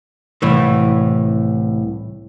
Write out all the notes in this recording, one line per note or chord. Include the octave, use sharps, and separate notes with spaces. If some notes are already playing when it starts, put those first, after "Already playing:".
C2 A2 E3